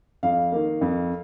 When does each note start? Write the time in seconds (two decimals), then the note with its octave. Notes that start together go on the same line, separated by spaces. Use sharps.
0.23 F2 F5
0.52 D#3 A#3
0.81 F2